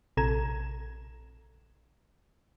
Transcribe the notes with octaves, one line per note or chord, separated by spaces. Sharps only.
A#1 C3 A4 A#5 G#6 E7